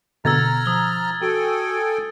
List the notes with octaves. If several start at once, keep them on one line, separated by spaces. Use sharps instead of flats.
B2 D3 B3 A#5 E6 F6 G#6 A6
F3 D#6 G7
F#4 A4 G5 G#5